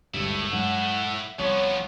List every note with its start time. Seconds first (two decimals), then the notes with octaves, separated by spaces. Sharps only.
0.14 G#1 D2 G2 A3 E4
0.53 G2 F#3 G#3 F#5
1.39 C2 F3 B3 C#5